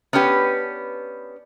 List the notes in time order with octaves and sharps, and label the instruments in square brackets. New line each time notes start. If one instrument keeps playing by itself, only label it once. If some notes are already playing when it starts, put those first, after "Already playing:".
[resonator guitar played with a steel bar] B3 C#4 D4 G4 B4